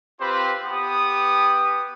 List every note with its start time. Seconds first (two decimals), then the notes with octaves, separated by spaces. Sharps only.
0.20 C4 F4 G4 B4 C5 B5
0.64 B3 G4 D#6